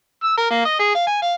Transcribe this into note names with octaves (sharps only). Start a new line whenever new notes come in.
E6
A#4
A#3
D#5
G#4
F5
G#5
F5